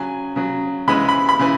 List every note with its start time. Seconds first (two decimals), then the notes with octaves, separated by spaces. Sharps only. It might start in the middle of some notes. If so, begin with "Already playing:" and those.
Already playing: C#3 F#3 G#5
0.36 C#3 F#3
0.88 C#3 E3 G#3 B5
1.09 B5
1.29 B5
1.39 C#3 E3